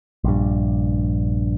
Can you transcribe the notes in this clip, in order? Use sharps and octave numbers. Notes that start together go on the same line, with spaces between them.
A#1 G2